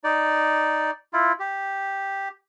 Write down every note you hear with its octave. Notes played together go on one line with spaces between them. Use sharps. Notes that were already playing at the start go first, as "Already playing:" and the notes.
D#4 D5
E4 F4
G4